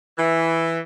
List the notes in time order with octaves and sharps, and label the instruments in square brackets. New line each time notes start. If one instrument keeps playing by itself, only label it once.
[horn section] E3